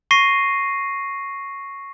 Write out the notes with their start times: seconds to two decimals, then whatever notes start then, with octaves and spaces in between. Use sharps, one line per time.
0.11 C#6 A#6 C7 D#7